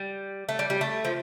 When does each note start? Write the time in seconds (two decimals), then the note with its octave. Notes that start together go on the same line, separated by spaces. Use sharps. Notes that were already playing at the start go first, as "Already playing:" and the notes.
Already playing: G3
0.49 A3
0.59 G3
0.70 G3
0.81 A3
1.05 F3